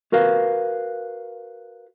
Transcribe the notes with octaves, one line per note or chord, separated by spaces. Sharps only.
F#4 A#4 B4 F5